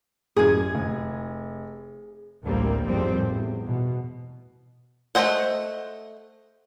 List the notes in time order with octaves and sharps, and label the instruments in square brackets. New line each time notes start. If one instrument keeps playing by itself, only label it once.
[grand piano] A1 F#2 G#6 [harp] G#4
[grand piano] F1
[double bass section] A1 D2 A2 G3 A#3 C4
G#1 F2 A2 F3 G3 C4
E2
B2
[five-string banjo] A3 D4 C5 D#5 F#5